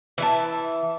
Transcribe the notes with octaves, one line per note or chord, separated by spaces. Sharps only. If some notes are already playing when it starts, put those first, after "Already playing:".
E3 E5 A5